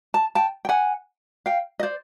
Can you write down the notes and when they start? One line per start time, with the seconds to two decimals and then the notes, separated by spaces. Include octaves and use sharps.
0.14 A5
0.35 G5 A5
0.65 G5
0.69 F#5 G#5
1.46 F5 G5
1.80 D#5
1.83 C5 D5